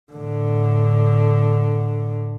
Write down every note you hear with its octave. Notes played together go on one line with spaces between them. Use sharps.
A2 D3